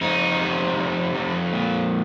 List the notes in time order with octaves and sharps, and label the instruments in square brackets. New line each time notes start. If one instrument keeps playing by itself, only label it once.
[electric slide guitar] F2 D#4
C3
F2
F2
A#2